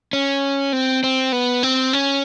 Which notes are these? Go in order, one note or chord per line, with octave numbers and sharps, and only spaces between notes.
C#4
C4
C4
B3
C4
C#4